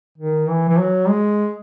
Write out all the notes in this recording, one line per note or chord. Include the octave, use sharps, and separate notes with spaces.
D#3
E3
E3
F#3
G#3